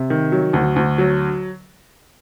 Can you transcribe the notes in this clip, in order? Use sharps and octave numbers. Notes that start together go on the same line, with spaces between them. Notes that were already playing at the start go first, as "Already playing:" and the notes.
Already playing: C3
D#3
F#3
D2
D2
F#3